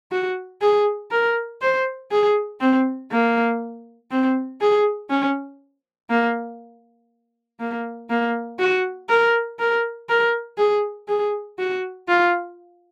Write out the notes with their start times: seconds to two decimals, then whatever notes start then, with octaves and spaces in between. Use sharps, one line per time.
0.12 F#4
0.62 G#4
1.11 A#4
1.62 C5
2.11 G#4
2.60 C4
3.11 A#3
4.11 C4
4.60 G#4
5.10 C#4
6.10 A#3
7.60 A#3
8.10 A#3
8.59 F#4
9.09 A#4
9.59 A#4
10.09 A#4
10.58 G#4
11.08 G#4
11.59 F#4
12.08 F4